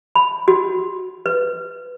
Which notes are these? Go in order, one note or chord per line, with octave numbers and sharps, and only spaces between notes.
B5
F#4
B4